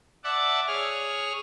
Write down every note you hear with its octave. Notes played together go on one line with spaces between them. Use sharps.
D5 E5 F#5 A5 D6
G#4 C#5 F6